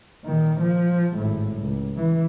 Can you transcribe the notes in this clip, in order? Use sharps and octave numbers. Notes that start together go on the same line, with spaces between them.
A#2 D#3
F3
G#1 A2
C#2
E3